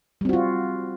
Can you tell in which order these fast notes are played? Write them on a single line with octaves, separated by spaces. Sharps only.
G3 C4 F#4 F4